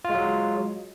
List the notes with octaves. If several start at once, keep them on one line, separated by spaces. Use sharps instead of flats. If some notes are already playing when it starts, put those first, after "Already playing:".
F#3 G#3 F4